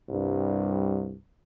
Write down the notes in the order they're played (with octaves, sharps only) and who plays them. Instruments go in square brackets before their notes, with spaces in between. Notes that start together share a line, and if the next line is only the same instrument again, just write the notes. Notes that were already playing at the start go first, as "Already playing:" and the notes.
[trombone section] C2 G2